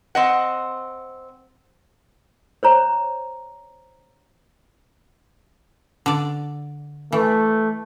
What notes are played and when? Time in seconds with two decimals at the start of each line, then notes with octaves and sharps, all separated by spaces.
0.15 C4 D#5 F#5
2.63 C5 C#5 A#5
6.06 D3 D5
7.12 E3 A3